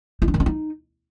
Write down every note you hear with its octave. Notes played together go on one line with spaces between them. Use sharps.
E4
D4
D#3
D4
D#4